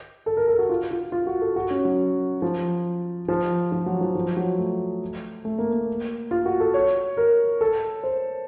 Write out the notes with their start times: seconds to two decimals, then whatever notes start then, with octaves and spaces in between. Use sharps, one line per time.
0.26 A4
0.37 A#4
0.48 A4
0.59 F#4
0.69 F4
0.91 F4
1.12 F4
1.27 F#4
1.41 A4
1.56 F#4
1.70 C#4
1.85 F#3
2.42 F3
3.29 F3
3.72 F3
3.86 F#3
4.01 F3
4.15 F3
4.37 F#3
4.58 A3
5.45 A3
5.59 A#3
5.73 A#3
6.31 F4
6.46 F#4
6.60 A4
6.74 C#5
7.17 A#4
7.61 A4
8.04 C5